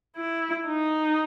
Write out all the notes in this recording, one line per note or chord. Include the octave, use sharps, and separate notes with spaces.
E4
D#4